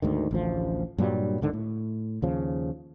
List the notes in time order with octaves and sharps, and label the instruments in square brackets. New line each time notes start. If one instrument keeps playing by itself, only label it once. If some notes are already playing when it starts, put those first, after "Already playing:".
[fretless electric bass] D2 G#2 D#3
A1 D2 F3
G2 A#2 F#3 G3
C#2 G#2 D3 D#3
A2
D#2 C#3 F3